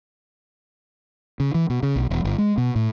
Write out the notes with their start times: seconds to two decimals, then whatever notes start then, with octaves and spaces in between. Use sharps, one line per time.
1.40 C#3
1.54 E3
1.70 B2
1.83 C#3
1.96 B1
2.10 E1
2.24 G1
2.38 G#3
2.58 B2
2.76 A2